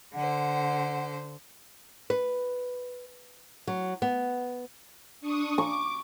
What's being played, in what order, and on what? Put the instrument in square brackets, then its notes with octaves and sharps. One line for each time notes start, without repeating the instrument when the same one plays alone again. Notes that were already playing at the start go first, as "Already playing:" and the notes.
[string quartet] D3 C5 [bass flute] F#5
[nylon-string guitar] B4
F#3
B3
[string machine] D4 C#6 D#6
[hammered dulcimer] C#6 [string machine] D6